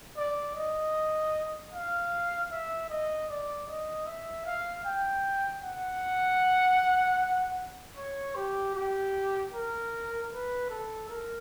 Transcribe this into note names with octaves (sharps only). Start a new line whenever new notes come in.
D5
D#5
F5
E5
D#5
D5
D#5
E5
F5
G5
F#5
C#5
G4
G4
A#4
B4
A4
A#4